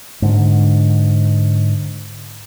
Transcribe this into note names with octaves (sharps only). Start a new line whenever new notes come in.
G#2 D3